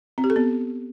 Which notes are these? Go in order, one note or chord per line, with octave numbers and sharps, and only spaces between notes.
C4
G4
A4
B3